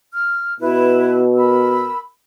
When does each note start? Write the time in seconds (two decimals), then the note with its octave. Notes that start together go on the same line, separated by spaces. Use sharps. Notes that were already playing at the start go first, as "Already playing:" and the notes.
0.13 F6
0.60 B2 E4 B4
1.36 A#4 B5 E6